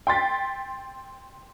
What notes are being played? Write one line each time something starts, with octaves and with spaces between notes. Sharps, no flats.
G5 C6 A6 B6